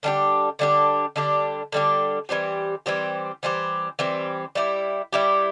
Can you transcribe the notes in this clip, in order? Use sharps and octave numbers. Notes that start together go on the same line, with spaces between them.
D3 G3 D4 G4
D3 G3 D4 G4
D3 G3 D4 G4
D3 G3 D4 G4
E3 G3 C4 G4
E3 G3 C4 G4
E3 G3 C4 G4
E3 G3 C4 G4
G3 E4 G4
G3 E4 G4